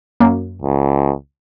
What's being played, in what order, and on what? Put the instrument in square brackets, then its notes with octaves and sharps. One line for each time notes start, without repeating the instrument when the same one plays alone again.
[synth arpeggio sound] F#2 A#3
[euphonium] C#2